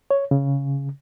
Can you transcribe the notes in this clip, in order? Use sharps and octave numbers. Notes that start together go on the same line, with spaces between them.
C#5
C#3